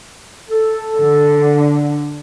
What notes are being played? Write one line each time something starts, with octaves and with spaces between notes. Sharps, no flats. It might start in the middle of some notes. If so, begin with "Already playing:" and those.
A4
D3